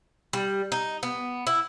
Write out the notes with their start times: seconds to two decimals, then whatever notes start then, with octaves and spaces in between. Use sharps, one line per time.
0.33 G3
0.72 D#4
1.03 B3
1.47 E4